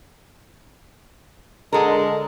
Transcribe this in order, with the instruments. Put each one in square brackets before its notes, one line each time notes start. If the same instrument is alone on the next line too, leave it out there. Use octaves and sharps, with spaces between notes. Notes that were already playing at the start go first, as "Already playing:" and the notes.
[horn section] D3 G#3 [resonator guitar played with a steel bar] A4 A#4